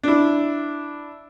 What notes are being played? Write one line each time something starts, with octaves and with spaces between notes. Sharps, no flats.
D4 E4